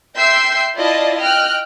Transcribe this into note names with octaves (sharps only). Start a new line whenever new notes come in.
E5 G5 C6 E6 G6 C7
E4 F4 D5 D#5 A5
D#5 G5 F6 F#6